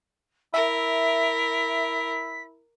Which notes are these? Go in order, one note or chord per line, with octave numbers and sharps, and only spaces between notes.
E4 A#4 E5 B6